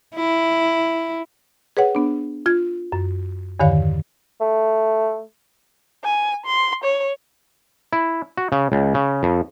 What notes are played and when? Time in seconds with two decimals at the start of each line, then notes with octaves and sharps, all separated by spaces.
0.15 E4
1.77 G#4 B4 C#5 F#5
1.95 B3 D4
2.46 F4 G#6
2.92 F#2
3.60 E2 G2 D3 D#3 C#5 F5
4.41 A3
6.04 G#5
6.46 C6
6.84 C#5
7.93 E4
8.37 F#4
8.52 C#3
8.72 C#2
8.94 C#3
9.23 F2